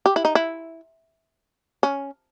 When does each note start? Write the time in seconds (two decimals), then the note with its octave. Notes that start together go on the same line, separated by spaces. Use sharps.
0.06 G4
0.16 E4
0.25 D#4
0.35 E4
1.83 C#4